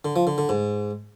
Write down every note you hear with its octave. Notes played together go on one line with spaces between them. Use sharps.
D3
F3
D3
D3
G#2